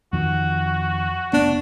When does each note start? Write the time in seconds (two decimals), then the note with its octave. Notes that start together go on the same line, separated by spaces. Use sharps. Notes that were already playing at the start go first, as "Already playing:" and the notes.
0.13 F2 D#3 F#4
1.33 F1 B3 D4